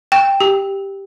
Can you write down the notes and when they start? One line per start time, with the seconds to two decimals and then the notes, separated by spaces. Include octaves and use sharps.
0.12 G5
0.40 G4